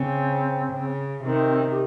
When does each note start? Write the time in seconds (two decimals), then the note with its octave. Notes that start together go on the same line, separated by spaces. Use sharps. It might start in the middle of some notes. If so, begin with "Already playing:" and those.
Already playing: C#3 C4
0.72 C#3
1.25 C3 D#3 C4
1.71 G4